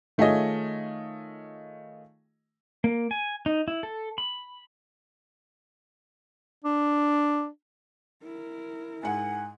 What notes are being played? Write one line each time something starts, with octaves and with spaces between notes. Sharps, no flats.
D#3 A3 F4 G#4 C#5 D#5
A#3
G#5
D#4
E4
A4
B5
D4
E4 A#4
G#2 F#5 G#5